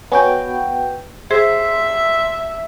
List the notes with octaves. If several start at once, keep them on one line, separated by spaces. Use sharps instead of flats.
B3 F#4 C#5 G5 G#5
G#4 C5 E5 C6